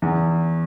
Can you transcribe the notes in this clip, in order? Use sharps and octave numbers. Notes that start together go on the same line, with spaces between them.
E2